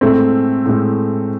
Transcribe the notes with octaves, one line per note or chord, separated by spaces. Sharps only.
A2 G#3 A3 C4
A2 G#3